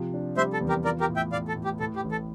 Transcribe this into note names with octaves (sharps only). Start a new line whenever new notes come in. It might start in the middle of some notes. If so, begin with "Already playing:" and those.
Already playing: C3 F3
D4
G3 C5 E5
A4
E2
G4 A#4
F4 A#4 D5
G4 A#4
A2
E5 G5
A2 D5 F5
A4
A2
G4
A2 A4
G4
A1
A4